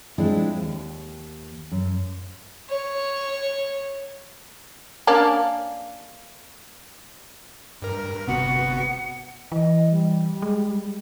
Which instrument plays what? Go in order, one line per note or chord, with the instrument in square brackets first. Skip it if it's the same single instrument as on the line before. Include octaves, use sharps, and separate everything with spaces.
[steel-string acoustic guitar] F3 G#3 C4 D4 E4
D#2
F#2
[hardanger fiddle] C#5
[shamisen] A#3 C#4 D4
[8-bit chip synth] G2 A#4
[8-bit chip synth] G1 B3 F#4 [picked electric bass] C3 [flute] F#5
[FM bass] E3 [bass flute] D#5
[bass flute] G3
[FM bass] G#3